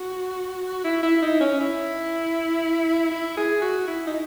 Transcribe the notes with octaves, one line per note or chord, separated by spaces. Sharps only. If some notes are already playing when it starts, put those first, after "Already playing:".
Already playing: F#4
E4
E4
D#4
C#4
E4
E4
G#4
F#4
E4
D#4